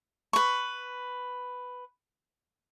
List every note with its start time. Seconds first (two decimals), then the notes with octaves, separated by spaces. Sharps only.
0.33 B4 C#6